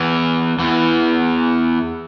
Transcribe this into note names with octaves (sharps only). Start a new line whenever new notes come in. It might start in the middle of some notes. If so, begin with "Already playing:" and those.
Already playing: E2 E3
E2 E3